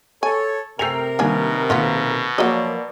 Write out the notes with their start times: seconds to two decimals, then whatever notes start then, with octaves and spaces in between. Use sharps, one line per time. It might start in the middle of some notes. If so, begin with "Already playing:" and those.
0.23 A4 C#5 G#5
0.79 C3 A3 A#4 G5 G#5 C7 F7
1.19 B2 D#3 G3 A#3 D4 G#5
1.70 B1 D#3 A#3 B3 F4
2.38 F3 F#3 A#3 F#4 A#4 D5 D#5